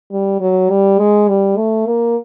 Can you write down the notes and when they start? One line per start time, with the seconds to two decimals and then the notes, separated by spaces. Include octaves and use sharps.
0.12 G3
0.40 F#3
0.70 G3
0.99 G#3
1.28 G3
1.57 A3
1.86 A#3